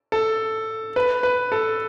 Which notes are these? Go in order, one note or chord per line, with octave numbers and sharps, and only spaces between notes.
A4
B4
B4
A4